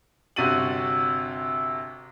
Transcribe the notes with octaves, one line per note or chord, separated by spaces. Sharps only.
G1 C3 F#4 A6 D#7 F#7